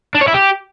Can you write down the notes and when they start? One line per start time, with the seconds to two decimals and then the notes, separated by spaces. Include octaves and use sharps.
0.15 D4
0.21 C#5
0.28 E4
0.34 G4